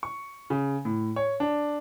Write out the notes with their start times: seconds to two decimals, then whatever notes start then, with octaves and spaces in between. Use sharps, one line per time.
0.03 C#6
0.50 C#3
0.85 A2
1.16 C#5
1.40 D4